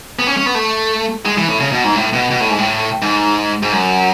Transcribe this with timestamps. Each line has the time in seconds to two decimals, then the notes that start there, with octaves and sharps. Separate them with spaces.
0.19 B3
0.27 C#4
0.37 C#4
0.46 B3
0.55 A3
1.25 G#3
1.37 E3
1.49 A2
1.60 C#3
1.73 B2
1.84 G#2
1.96 A2
2.13 B2
2.31 B2
2.41 A2
2.50 G#2
2.58 A2
3.02 G#2
3.63 G#2
3.72 F#2